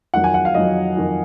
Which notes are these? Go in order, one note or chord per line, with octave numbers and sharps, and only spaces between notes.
F2 D#3 F#3 F#5
G#5
F#5
F5
F2 D#3 F#3 D#5
F2 D#3 F#3